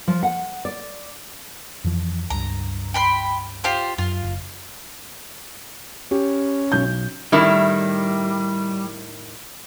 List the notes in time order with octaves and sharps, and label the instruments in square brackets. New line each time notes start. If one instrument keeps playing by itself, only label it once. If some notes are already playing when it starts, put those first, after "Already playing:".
[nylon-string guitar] F3
F#5
D5
[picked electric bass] F2 E3 F3
[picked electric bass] C#2 G2 [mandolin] A#5
[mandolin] G5 B5 C6
F4 G4 C5
[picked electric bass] F#2 [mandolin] F4
[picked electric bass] F#1
[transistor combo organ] C#4 [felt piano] G4
[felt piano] B1 G6
[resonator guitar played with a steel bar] A2 D#3 E4 [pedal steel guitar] G3